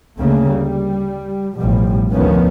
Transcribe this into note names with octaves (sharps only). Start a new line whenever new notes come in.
D2 C#3 A3 A#3
G3
A1 B2 F3 G3
F1 D2 D#3 F3 B3 C#4